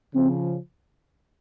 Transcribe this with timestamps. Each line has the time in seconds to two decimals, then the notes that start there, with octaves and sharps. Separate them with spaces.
0.15 C#3 F3 C4